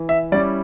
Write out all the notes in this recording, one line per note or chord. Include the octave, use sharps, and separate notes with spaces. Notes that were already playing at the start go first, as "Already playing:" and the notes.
Already playing: E3
E5
G3 C#4 E4 D5